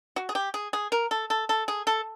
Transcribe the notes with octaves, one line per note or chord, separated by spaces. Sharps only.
F#4
G#4
G4
G#4
G#4
A#4
A4
A4
A4
G#4
A4